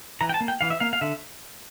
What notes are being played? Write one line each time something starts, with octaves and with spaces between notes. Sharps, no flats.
E3 A#5
G5
A5
A#3
G5
E3 F5
E5
A#3 F5
F5
D3 E5